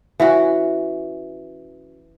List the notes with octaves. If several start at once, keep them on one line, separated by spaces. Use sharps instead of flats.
E3 C#4 F#4